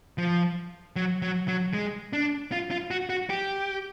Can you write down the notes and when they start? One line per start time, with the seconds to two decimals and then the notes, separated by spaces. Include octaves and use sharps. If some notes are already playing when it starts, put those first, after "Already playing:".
0.18 F3
0.96 F#3
1.22 F#3
1.48 F#3
1.73 G#3
2.13 D4
2.52 F4
2.71 F4
2.91 F#4
3.10 F#4
3.30 G4